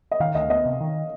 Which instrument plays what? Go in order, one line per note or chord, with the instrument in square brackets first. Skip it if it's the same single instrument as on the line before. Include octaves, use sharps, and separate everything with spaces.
[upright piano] D#5
[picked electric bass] D#3 [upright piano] F5
[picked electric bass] D2 [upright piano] D#5
[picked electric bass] B3 [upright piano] D#5
[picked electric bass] C3
D#3